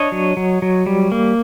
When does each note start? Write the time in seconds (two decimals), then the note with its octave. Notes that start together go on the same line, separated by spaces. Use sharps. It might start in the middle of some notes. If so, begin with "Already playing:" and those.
Already playing: D4 C#5 D#5
0.12 F#3
0.37 F#3
0.62 F#3
0.86 G3
1.12 A#3